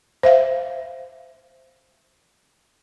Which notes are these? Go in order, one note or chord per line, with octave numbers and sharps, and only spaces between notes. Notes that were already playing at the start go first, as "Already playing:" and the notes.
C5 E5 F5